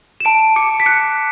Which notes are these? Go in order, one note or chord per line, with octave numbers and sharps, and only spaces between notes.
E7
A5 D7
D6 C#7
B6
F#6 C#7